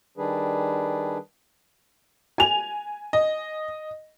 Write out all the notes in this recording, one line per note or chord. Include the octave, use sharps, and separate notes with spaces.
D#3 G3 D4 G#4 B4
G#5 F7
D#5